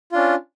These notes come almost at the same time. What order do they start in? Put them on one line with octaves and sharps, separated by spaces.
F4 D4 C#4